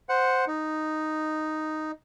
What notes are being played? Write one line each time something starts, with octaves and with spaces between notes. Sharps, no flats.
C5 F#5
D#4